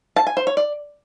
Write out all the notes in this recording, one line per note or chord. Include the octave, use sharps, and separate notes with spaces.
A5
G#5
C5
C#5
D5